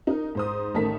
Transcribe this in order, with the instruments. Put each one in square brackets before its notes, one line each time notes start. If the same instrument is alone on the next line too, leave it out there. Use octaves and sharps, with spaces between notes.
[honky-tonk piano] D#4 A#4
G#2 C5 D#6
A1 D#3 A3 A#4 A5 B6